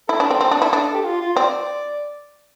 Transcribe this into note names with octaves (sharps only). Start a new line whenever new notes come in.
E4 A4
D4
C4
C4
D4
E4
D4
G4
F4
F4
C4 D5